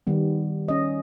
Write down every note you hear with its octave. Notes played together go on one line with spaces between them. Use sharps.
D#3 G3 B3
C#4 D#5